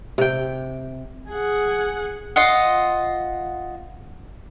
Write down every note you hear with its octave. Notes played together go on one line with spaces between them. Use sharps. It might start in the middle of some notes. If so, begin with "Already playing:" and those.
C3 G5
G#4 F#5
F4 D#5 F#5